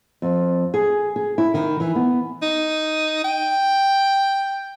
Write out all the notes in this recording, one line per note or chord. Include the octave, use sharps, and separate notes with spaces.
F2
G#4
G#4
E4
D#3
E3
B3
D#4
G5